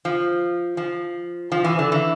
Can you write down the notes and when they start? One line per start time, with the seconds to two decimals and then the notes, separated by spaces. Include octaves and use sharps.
0.05 F3
0.77 F3
1.52 F3
1.64 E3
1.79 D3
1.92 E3